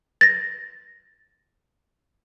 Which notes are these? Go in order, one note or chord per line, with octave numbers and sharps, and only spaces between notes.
A6 A#6